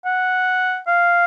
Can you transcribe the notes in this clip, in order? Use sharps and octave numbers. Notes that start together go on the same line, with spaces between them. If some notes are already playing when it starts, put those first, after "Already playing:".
F#5
F5